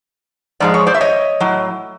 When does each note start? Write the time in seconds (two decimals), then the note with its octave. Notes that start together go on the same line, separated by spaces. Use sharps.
0.60 G#2 F3 G#3 D5
0.74 C#5
0.87 C5 D5
0.94 E5
1.01 C#5 D#5
1.40 A2 F#3